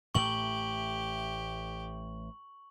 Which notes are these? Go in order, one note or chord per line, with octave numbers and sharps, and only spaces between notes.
A1 A2 A3 G4 C#6 F#7